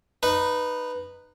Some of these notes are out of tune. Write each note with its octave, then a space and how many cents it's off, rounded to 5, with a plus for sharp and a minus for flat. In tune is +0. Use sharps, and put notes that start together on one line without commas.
D#4 -15 B4 +0